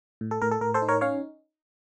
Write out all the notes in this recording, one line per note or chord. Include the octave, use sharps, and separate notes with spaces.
A2
A4
A2 A#4
A4
A2 A#4
A4 C5
D#4
A#4 C#5
C#4 C#5 F5